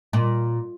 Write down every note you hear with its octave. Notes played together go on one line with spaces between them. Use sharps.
A#2